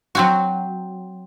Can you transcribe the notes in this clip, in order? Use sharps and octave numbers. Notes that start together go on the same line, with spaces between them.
F#3 C4 F#4